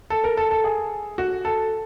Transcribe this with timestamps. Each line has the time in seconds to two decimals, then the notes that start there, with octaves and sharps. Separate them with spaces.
0.10 A4
0.24 A#4
0.37 A4
0.51 A4
0.64 G#4
1.18 F#4
1.45 A4